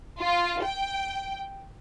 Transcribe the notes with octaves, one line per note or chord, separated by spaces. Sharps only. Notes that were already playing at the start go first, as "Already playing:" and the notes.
F4
G5